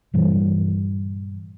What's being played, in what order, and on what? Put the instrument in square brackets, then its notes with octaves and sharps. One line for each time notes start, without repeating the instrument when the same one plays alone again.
[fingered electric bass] G2 A#2 E3 G3